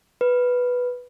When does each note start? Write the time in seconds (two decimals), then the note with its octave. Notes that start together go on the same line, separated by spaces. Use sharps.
0.21 B4